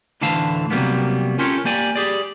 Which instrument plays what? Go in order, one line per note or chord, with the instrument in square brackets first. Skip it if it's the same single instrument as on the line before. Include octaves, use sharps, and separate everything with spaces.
[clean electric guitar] D2 A2 D3 E3 F5 A5
C3 F#3 G3 A#3 B3
C#4 F4 G4 A4 A#4 C#5
A#3 G4 D5 G#5
G4 G#4 D5